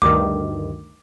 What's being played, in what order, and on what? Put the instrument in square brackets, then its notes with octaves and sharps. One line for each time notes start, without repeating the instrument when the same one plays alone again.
[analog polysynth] D2 G2 D#3 [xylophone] D6